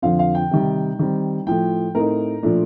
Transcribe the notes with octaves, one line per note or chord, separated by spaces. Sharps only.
F2 D3 F3 C4 F5
F5
G5
C3 D#3 G3
D#3 G3 C4
A2 F3 A3 G5
A2 A3 C4 D#4 A#4
A#2 F3 A3 D4